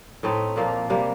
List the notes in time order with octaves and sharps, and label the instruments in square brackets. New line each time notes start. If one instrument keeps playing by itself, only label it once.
[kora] A2 A3 C4 D#4
A#2 F3 A#3
C3 G3 A#3